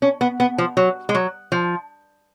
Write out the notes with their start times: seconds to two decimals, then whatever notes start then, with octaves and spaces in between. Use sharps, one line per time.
0.02 C#4
0.21 B3
0.40 B3
0.58 F3
0.77 F#3
1.09 G#3
1.15 F#3
1.52 F3